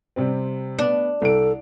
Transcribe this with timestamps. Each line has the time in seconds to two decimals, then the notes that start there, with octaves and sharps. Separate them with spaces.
0.16 C3 G3 C4
0.79 B3 D4
1.22 C2 A4 D7